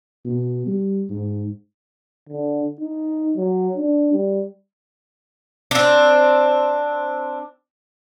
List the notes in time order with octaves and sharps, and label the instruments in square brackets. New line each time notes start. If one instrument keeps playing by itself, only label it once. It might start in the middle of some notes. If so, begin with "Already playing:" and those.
[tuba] B2
G3
G#2
[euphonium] D3
D#4
F#3
D4
G3
[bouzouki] C4 D4